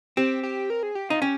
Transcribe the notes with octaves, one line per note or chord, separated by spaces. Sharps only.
C4 G4
G4
A#4
G#4
G4
D#4 F4
C#4 G4